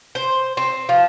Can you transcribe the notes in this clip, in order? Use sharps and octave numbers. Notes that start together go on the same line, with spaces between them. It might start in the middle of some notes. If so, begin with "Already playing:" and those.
C5
C4
F3